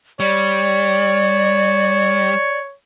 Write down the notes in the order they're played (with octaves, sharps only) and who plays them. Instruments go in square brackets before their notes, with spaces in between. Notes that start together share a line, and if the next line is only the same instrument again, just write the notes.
[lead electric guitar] G3 [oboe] C#5 [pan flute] D5